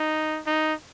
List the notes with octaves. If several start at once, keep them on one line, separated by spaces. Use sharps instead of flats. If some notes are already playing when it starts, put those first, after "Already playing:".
Already playing: D#4
D#4